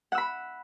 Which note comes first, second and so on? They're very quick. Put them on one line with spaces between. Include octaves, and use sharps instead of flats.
F#5 E6 B5